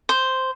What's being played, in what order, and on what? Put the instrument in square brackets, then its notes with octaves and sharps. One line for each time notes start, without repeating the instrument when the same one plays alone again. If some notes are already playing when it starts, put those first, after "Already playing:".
[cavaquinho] C5